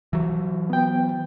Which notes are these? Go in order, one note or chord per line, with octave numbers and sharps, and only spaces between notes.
E3 F#3
B3 G5